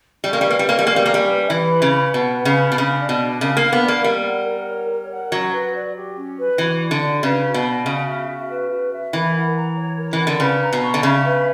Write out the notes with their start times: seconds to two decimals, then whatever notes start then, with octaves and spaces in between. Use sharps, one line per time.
0.23 G3 C#4
0.33 A#3
0.41 G3
0.45 B4
0.51 A#3
0.59 G3
0.66 A#3 C#4
0.79 G3
0.87 A#3 G4
0.96 G3
1.06 A#3 C#4
1.14 G3
1.29 B4
1.50 E3 B4
1.72 B5
1.82 C#3
1.93 B4
2.14 B2 F#5
2.35 B4
2.45 C#3
2.57 B5
2.72 B2
2.77 C#3 D4
2.99 D5
3.09 B2
3.20 D4
3.41 C#3 A#4
3.57 A#3
3.62 D4
3.73 B3
3.84 A#3 D5
4.04 G3 A#4
4.26 F#5
4.48 A#4
4.68 C#5
4.90 A#4
5.11 F#5
5.32 F#3 C#4
5.53 B4
5.74 D5
5.95 G4
6.16 C#4
6.38 B4
6.58 E3 F#4
6.80 D5
6.91 D3
7.01 F#4
7.23 C#3 B4
7.44 F#4
7.54 B2
7.65 D5
7.86 C#3 F#4
8.07 E5
8.28 F#4
8.50 B4
8.71 F#4
8.92 E5
9.13 E3 A#4
9.34 F#5
9.55 A#5
9.76 C#5
9.97 A#4
10.13 E3
10.19 F#5
10.27 D3
10.40 C#3 B4
10.61 A#5
10.73 B2
10.82 C#6
10.94 D3
11.03 C#3 E5
11.25 B4